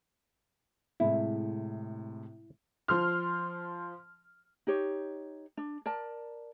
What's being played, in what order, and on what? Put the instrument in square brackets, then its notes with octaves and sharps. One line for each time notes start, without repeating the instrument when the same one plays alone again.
[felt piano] A2 C3 G#3 [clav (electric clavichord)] E4
[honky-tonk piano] F3 C6 F6
[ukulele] D#4 G4 C#5
D4
A#4 D5 A5